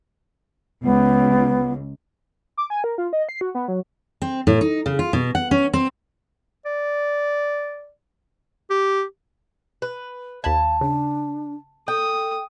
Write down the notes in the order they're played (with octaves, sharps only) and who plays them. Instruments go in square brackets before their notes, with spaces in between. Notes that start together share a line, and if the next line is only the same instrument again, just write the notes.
[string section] C#2 [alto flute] B3
[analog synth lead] D6
G#5
A#4
F4
D#5
C7
F#4
B3
F#3
[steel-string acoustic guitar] C4
A2
D#4
C#3
F4
B2
F#5
C#4
C4
[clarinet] D5
G4
[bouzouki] B4
[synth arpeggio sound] D#2 B5 G#6 [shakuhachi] F5 [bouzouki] A5
[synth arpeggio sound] C#3 [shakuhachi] D4
[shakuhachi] A4 [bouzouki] G5 [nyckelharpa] D#6